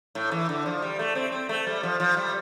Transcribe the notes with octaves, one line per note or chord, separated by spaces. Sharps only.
A2
E3
D3
F3
G3
A3
C4
C4
A3
G3
F3
F3
G3